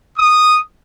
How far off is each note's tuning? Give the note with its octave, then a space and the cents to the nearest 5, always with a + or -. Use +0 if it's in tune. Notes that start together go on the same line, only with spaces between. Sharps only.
D#6 -10